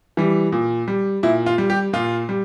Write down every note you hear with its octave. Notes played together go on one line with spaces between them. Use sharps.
E3 G3
A#2
G3
A#2 E4
F4
G3
G4
A#2 F4
G3